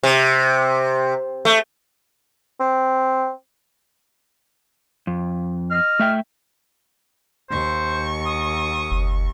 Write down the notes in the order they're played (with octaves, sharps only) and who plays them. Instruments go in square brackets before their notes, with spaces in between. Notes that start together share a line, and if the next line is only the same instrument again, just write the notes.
[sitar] C3
A3
[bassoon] C4
[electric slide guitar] F2
[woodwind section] D#5 F6
[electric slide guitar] A3 E5 G5
[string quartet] D#2 C#6 [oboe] C5
[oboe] D#6
[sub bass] F#1